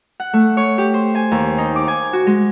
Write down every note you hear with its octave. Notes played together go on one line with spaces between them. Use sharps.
F#5
A3
C#5
G4
C5
G#5
D#2
D#4
D6
G#5
F#4
G#3